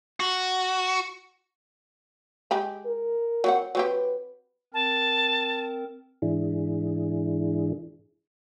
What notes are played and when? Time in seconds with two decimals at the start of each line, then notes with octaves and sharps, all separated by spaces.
0.20 F#4
2.51 G#3 G4 B5
2.86 A#4
3.44 F#3 C4 F#5
3.75 F#3 C4 G4 B4
4.74 C4 A#4 A5
6.22 G#2 E3 D4 E4 G#4